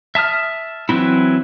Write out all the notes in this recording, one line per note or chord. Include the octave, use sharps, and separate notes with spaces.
E5 A5 D#6 F6
E3 F#3 C4 E4